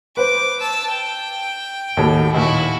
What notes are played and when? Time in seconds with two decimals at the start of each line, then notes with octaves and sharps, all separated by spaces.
0.17 B4 C5 D6
0.61 A5 E6
0.92 G5
1.97 D#2 A2 F#4
2.34 D#2 A#2 E4 F#4